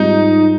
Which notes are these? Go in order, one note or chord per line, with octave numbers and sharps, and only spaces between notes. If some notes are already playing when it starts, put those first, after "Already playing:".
Already playing: G#2 G3 C4 D#4 F4